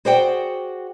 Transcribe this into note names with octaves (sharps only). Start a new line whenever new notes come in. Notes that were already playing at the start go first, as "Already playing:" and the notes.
F#4 G#4 C5 D5 F#5 G5